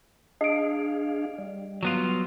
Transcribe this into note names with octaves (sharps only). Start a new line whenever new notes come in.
D4 G#4 D#5 F5 D7
G3
F#3 B3 F4